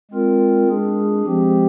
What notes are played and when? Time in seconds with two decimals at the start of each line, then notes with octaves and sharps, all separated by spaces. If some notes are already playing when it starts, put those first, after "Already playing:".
0.11 G#3 C4 F4 A#4
0.69 G#3 D4 G#4
1.26 F3 G#3 C4 G4